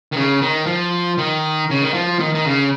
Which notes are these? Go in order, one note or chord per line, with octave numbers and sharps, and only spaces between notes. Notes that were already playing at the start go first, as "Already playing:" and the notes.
D#3
C#3
D#3
F3
D#3
C#3
D#3
F3
D#3
D#3
C#3